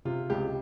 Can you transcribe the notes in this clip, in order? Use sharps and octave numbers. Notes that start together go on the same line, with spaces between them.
C3 F4
C#2 G4